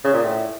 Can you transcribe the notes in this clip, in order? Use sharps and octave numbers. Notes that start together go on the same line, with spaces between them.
C#3
A#2
A2